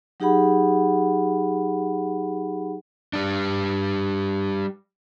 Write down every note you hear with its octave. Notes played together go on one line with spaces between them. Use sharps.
F#3 D#4 G4 G#4 F#5 B5
G3 D4